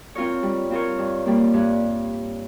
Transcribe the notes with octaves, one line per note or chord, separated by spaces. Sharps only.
C4 F4 A#4 C#5
G3
C4 F4 A#4 C#5
G2
G3 A#3
G2